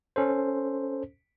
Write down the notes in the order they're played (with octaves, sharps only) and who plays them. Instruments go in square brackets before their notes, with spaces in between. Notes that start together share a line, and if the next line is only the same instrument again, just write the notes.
[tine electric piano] C#4 A4 C5